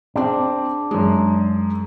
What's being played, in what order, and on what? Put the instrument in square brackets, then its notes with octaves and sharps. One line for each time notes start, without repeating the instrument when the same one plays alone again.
[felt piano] C4 G#4 [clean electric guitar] D4
[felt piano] F#2 G#3